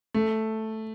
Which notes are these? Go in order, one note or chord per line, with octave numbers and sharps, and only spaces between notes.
A3